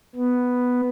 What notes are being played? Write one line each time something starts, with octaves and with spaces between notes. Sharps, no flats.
B3